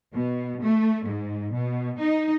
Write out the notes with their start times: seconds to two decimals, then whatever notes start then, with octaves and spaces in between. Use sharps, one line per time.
0.14 B2
0.63 A3
1.06 G#2
1.55 B2
2.00 D#4